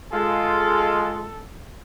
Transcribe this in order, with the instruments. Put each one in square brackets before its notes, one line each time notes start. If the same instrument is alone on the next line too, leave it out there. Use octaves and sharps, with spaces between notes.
[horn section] G#3 F4 [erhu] A4